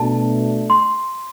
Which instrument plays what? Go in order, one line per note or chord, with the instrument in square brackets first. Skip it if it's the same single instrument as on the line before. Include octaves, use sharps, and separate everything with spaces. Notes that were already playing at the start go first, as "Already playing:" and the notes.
Already playing: [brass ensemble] B2 A3 D4 [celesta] A5
[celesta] C6